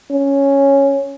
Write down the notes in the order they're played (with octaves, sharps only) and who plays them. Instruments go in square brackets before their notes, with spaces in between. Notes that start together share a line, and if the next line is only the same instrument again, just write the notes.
[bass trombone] C#4